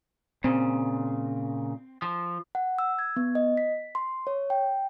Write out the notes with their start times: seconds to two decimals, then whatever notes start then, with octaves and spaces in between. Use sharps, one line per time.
0.44 A#2 C#3 C4
2.02 F3
2.55 F#5
2.79 E6
2.99 G#6
3.16 B3
3.35 D#5
3.57 B6
3.95 C6
4.27 C#5
4.50 G5